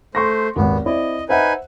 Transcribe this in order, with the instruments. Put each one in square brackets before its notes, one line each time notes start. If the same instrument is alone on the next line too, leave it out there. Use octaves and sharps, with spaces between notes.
[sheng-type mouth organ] A3 C5 [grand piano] C6 C#6 A#6
[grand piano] G#1 D#2 [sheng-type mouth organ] B3
[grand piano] C4 E4 D5 [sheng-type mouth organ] D#5
[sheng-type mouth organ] D#4 B4 G#5 [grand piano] C5 E5 F#5